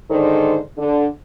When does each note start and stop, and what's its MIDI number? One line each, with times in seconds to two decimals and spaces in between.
0.11 0.59 44
0.11 0.59 50
0.11 0.59 51
0.11 0.59 69
0.11 0.59 72
0.11 0.59 74
0.78 1.06 50